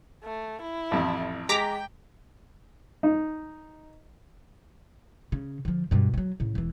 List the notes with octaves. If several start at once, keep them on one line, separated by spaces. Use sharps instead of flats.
A3
E4
A1 F2
G#3 G5 A#5 D6 B6
D#4
C#3
D3 F3
G2 B2
F3 F#3
A2 C#3
E1 E3